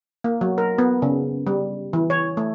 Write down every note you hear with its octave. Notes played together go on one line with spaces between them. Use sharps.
A#3
F#3
A#4
B3
C#3
G3
E3
C#5
A3